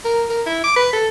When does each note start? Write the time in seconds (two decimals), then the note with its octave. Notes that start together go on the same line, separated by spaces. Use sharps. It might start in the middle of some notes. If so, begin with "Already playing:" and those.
0.05 A#4
0.30 A#4
0.46 E4
0.64 D6
0.76 B4
0.93 A4